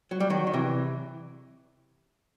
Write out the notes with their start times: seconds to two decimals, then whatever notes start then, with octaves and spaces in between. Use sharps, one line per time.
0.11 F#3
0.20 G3
0.30 D#3 F#3
0.47 D#3
0.54 C3 E3